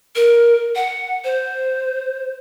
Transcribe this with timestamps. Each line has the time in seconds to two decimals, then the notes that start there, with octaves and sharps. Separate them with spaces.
0.16 A#4
0.75 F#5
1.24 C5